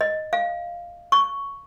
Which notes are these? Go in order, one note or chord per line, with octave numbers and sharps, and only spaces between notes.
D#5
F5
C#6